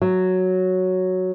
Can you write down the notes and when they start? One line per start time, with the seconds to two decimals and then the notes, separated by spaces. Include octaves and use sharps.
0.01 F#3